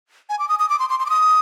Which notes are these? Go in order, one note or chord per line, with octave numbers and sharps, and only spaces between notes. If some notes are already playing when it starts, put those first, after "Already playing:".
G#5
D6
D#6
D#6
D6
C6
C6
C6
D6
D#6